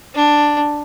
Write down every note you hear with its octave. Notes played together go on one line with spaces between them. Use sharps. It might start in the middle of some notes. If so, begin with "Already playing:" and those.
D4